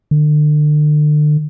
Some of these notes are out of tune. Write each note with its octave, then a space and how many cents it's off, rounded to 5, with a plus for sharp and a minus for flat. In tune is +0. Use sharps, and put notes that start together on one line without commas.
D3 +35